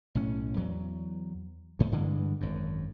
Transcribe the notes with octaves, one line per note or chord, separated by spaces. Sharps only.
B1 A2 C#4
E2 F#3
D2 G#2
G2 D3 E3 G#3
G#1 F#2